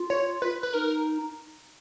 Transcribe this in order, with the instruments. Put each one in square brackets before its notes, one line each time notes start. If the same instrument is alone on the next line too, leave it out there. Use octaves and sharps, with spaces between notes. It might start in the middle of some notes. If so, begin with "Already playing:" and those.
Already playing: [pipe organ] F4
[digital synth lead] C#5
B4
B4
[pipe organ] D#4 [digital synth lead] A#4